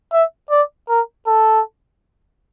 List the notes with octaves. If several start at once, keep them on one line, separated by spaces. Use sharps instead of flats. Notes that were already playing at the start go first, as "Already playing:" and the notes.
E5
D5
A#4
A4